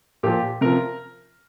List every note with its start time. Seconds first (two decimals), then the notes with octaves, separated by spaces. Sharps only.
0.23 A#2 F3 G4
0.61 C3 F3 A#4